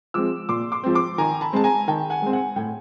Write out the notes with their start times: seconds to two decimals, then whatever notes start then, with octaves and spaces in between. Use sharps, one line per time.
0.14 F3 G#3 C4 D6 E6
0.49 A#2 C6 D6
0.72 C6 D6
0.84 F3 G#3 C4
0.95 C6 D6
1.18 D#3 G#5 A#5
1.41 A5 B5
1.53 G#3 C4 A5
1.64 G#5 A#5
1.88 D#3 G5 A5
2.10 F#5 G#5
2.22 G#3 C4
2.33 F#5 G#5
2.56 A2 G5